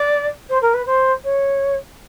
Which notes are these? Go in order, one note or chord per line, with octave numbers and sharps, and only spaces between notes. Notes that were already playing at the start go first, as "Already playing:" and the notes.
Already playing: D5
C5
A#4
B4
C5
C#5